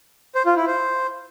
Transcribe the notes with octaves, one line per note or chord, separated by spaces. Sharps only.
C5
F4
E4
C5